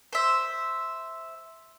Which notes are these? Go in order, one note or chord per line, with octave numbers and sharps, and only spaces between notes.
C5 E5